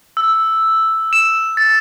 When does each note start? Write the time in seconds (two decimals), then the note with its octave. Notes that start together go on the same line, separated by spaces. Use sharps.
0.17 E6
1.13 E7
1.57 A6